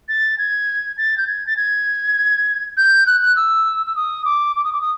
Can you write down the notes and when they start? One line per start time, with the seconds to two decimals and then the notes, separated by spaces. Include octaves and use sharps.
0.09 A6
0.38 G#6
0.98 A6
1.18 G6
1.27 G#6
1.47 A6
1.57 G#6
2.77 G6
3.07 F#6
3.21 F#6
3.36 E6
3.86 E6
3.96 D#6
4.25 D6
4.56 D6
4.64 D#6
4.73 D6
4.81 D#6